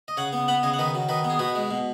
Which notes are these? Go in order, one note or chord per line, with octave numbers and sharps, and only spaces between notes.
D#5
C#3 C#5 F#5
B3
B3 F#5 B5
C#3 D#5 G#5
F#5
D#3 B4 D#5
F#3
D#3 B4 D#5
B3
G#4
B2 F#4 B4
G#3
B2